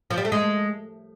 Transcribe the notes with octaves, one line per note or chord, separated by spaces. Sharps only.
F3
G3
A3
G#3